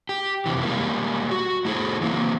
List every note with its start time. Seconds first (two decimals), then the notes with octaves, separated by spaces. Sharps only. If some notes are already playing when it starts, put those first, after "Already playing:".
0.09 G4
0.46 F2 C3 E3
0.63 G3 G#3 A#3
1.31 F#4
1.65 A3 E4 G#4 A4
2.01 E3 F#3 A#3 C4